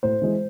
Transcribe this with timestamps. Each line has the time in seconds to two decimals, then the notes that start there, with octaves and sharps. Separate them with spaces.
0.03 A2 C5
0.22 E3 G#3